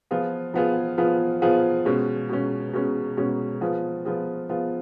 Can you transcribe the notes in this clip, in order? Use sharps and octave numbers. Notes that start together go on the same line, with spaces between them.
F3 B3 F4 G#4
F3 B3 F4 G#4
F3 B3 F4 G#4
F3 B3 F4 G#4
B2 G#3 C#4
B2 G#3 C#4
B2 G#3 C#4
B2 G#3 C#4
F3 B3 F4 G#4
F3 B3 F4 G#4
F3 B3 F4 G#4